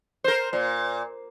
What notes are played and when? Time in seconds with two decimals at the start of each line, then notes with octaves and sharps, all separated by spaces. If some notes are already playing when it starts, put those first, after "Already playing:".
0.24 A#4 C5
0.53 A#2